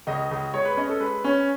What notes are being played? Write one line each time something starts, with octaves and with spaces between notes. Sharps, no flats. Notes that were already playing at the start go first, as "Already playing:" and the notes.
C#2 D#5
C#2
G#3 C#5
B4
C#5
C#4 D#5
A4
G#3 B4
C#4